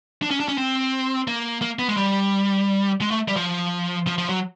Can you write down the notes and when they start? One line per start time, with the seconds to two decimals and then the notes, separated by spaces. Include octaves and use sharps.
0.22 D4
0.31 C#4
0.40 D4
0.48 C#4
0.58 C4
1.28 A#3
1.62 A#3
1.79 B3
1.89 G#3
1.97 G3
3.01 G#3
3.11 A3
3.28 G3
3.36 F3
4.07 F3
4.18 F3
4.29 F#3